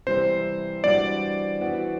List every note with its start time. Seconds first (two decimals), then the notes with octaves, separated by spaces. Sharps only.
0.07 C3 E3 G3 C4 C5
0.83 E3 G3 D4 F#4 D5
1.61 E3 B3 F#4